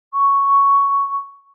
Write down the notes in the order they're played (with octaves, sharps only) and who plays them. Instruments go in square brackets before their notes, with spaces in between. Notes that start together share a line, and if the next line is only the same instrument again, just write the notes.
[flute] C#6